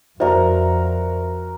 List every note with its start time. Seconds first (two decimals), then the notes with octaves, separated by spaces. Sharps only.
0.20 F2 F#4 A#4 C5 D5 E5